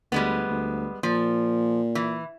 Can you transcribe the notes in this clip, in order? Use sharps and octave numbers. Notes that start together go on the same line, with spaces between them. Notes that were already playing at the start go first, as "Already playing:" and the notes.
D2 G3 G#3 B3
D2
A#2 F3
E3